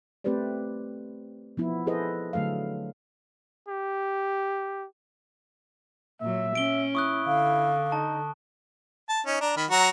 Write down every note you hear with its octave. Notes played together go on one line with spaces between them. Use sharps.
A3 C4 G4 B4 C5 D5
F3 B3 E4
E4 G#4 A4 B4 C5 D#5
D3 F#3 A3 A4 F5
G4
A#2 F#3 E5
C#4 D7 G7
E4 C#6 D#6 F#6
D3 F5
D#4 A5
A5
C#4 D#4
D4 A#5
D#3 B5
F#3 F#4 A#5